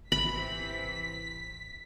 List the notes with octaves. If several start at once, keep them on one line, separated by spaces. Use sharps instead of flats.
G#1 C3 E3 C4 B5 B6